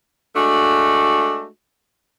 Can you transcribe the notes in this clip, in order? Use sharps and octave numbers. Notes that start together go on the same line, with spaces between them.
G#3 A3 D4 F#4